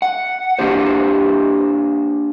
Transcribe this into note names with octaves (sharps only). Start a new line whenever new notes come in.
F#5
A#3 D4 G4 C5